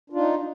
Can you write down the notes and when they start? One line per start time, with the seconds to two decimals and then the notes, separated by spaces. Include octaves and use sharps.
0.10 D4
0.13 F4
0.16 D#4